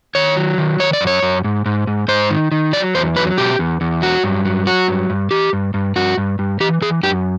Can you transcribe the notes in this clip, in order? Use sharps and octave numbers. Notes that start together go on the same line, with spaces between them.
D#3 C#5
F#3
D#3
D#3 C#5
D5
F#2
C#5
F#2
G#2
G#2
G#2
G#2 C5
D#3
D#3
F#3 D5
E2 C5
F#3 B4
B2 G4
E2
E2
F#3 F#4
G2
F#3
F#3 F#4
G2
G2
E3 G4
G2
G2
G2 F#4
G2
G2
E3 G4
E3 G#4
F#2 G4